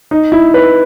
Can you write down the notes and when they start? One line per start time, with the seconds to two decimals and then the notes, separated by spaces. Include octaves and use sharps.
0.11 D#4
0.32 E4
0.54 B4